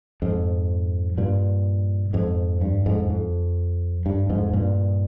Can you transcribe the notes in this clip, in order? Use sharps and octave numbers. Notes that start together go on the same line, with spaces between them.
F2 G#2
G2 A#2
F2 G#2
G2
F2 G#2
F2
G2
F2 G#2
G2 A#2